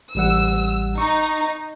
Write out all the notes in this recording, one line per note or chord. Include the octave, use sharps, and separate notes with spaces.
A1 G3 F#5 E6
D#4 C#6